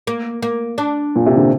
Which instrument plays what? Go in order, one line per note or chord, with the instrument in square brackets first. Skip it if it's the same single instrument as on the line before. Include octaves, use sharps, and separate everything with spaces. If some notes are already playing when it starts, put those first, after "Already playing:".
[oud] A#3
A#3
D4
[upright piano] A#2
C3
D3